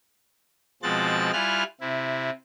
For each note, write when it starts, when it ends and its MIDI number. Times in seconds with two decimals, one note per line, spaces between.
0.83 1.31 47
0.83 1.31 53
0.83 1.31 56
0.83 1.31 60
0.83 1.31 90
0.83 1.31 93
1.33 1.63 55
1.33 1.63 64
1.33 1.63 65
1.33 1.63 80
1.33 1.63 89
1.33 1.63 90
1.81 2.30 48
1.81 2.30 64